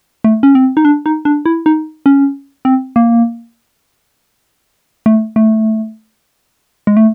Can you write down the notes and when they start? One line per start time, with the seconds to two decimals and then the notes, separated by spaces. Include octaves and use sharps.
0.24 A3
0.43 C#4
0.55 C4
0.77 D#4
0.85 D4
1.06 D#4
1.25 D4
1.46 E4
1.66 D#4
2.06 C#4
2.65 C4
2.96 A#3
5.06 A3
5.36 A3
6.87 G#3
6.97 A3